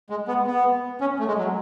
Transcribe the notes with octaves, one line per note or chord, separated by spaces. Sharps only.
G#3
B3
B3
C#4
A3
G#3
F#3